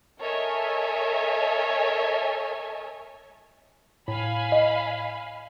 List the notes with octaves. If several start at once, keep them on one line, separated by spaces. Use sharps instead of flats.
A4 A#4 C#5 D#5 E5 G#5
A2 F5 G#5 B5
D#5